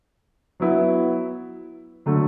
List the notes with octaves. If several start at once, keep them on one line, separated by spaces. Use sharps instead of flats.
F#3 B3 E4
D3 F#3 A3